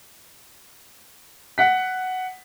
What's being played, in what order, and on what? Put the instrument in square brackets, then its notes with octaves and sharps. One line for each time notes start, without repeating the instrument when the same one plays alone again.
[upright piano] F#5 B6